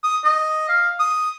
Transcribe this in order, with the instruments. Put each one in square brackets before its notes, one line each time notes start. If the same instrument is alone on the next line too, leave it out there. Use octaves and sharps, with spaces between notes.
[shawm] D#6
D#5
F5
D#6